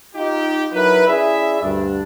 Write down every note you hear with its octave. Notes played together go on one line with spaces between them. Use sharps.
D#4 F4 G4
F#3 D#4 E4 A#4 B4
C#4 E4 G#4 D5 E5
D2 G2 D4